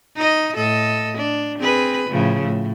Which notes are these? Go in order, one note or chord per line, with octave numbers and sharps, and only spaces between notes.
D#4 D#5
A2 A4 D#5
D4
C4 G#4 B4
A2 C#3 F3
A2